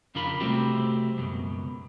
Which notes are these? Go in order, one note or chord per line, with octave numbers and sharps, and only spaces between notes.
F2 C#3 D4 F4 A#4 B5
C3 G3 A3 C4 F#4 G4
C#2 F#2 B2